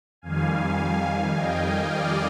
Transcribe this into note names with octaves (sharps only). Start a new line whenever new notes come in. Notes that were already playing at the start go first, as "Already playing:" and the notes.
F2 D#3 G3 F5 G#5
D#5 G5
D5 F5